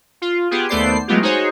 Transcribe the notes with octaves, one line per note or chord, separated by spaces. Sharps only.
F4
B3 F4 G4 G#4
D#2 A3 B3 C5 D5 C7
F#3 G#3 A3 B3 F4 G4
D#4 F#4 G#4 C5 C#5